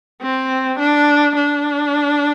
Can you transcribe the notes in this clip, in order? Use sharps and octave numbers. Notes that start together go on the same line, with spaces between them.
C4
D4
D4